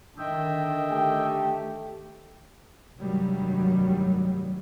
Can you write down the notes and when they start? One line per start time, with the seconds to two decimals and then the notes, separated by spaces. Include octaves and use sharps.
0.18 D3 D#3 D#5 E5 G5
0.92 A3 G4
2.98 F1 G2 D#3 F#3 G3